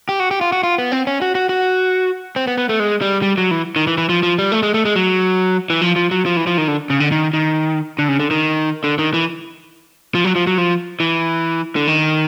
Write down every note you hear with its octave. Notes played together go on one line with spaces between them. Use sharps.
G4
F#4
G4
F4
F#4
F4
B3
C4
C#4
F#4
F#4
F#4
C4
B3
B3
A3
G#3
G3
G3
F#3
E3
D#3
E3
E3
F3
F3
G3
A3
G#3
A3
G#3
F#3
E3
F3
F3
F#3
F3
E3
F3
D#3
D3
C#3
D3
D#3
D#3
D3
C#3
D3
D#3
D3
D#3
E3
F3
F#3
F3
F#3
F3
E3
D3
D#3